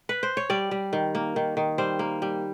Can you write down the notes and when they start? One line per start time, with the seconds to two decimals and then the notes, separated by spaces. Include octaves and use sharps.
0.09 B4
0.23 C5
0.37 C#5
0.50 G3 D5
0.71 G3
0.93 D#3
1.15 A#3
1.36 D#3
1.57 D#3
1.78 G3 C5
1.99 A#3
2.22 G3